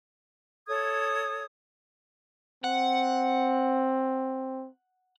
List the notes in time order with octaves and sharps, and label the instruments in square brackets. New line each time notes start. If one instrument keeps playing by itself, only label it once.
[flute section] A4 C#5 D#6 G#6
[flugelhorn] C4 [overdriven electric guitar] F#5